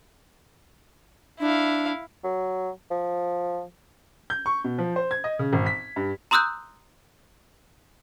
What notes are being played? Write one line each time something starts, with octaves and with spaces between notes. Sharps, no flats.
D4 E4 F5
F#3
F3
G6
C#6
B2
F3
C5
G#6
D#5
C#3
G#1
B6
G2
A#5 C6 D#6 E6 F#6 G6